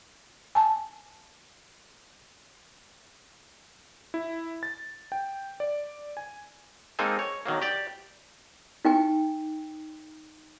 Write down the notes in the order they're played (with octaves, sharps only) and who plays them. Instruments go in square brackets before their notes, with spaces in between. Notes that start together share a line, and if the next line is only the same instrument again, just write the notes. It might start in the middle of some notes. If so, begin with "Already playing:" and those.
[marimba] G#5 A5
[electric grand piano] E4
A6
G5
D5
G#5
[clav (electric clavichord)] G#3 A#3 C4 D#4 A4 G#5
C#5
B1 D#3 F#3 A#3
G4 D5
[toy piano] D#4 G5 G#5